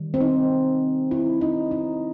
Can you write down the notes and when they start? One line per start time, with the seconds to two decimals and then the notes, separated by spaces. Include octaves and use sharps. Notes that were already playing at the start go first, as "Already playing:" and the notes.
Already playing: D#3 G3
0.14 C4
0.20 D#4
1.11 E4
1.41 D#4
1.71 D#4